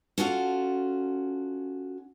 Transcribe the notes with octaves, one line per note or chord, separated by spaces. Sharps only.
C#4 F4 F#4 A4